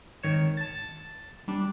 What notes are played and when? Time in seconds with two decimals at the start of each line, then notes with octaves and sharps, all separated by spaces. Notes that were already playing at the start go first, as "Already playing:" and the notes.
0.23 G#1 D#3 C#5 E7
0.57 A5 A6
1.48 G3 D4